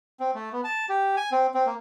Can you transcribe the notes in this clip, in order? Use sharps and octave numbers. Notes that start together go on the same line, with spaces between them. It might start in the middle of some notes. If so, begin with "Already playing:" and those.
C4
A3
B3
A5
G4
G#5
C4
C4
A#3